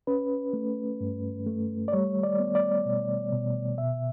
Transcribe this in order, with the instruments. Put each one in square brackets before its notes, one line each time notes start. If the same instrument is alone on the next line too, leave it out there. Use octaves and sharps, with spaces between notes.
[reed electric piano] C#4 B4
A3
G2
A3
D5
G3 C#5
D5
B3
D5
B2
B2
B2 E5